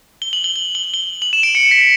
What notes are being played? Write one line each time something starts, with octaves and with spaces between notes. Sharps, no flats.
G7
F#7
G7
G7
G7
G7
F#7
E7
D7
C#7
B6